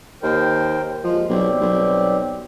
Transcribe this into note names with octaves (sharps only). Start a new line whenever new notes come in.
D#2 A#4 C5 G5
D#2 F3 G#3
B1 G3 C4 G4
B1